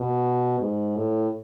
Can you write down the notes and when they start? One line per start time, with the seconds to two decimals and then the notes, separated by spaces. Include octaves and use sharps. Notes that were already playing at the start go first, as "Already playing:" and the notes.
Already playing: B2
0.60 G#2
0.96 A2